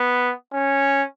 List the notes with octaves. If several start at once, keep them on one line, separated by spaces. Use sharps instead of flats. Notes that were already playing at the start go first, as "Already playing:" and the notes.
Already playing: B3
C#4